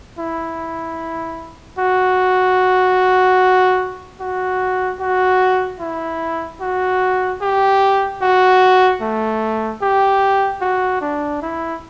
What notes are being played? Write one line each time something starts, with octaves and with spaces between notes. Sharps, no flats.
E4
F#4
F#4
F#4
E4
F#4
G4
F#4
A3
G4
F#4
D4
E4